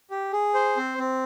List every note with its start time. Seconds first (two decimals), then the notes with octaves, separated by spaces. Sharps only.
0.11 G4
0.33 G#4
0.54 C5
0.77 C4
0.98 C4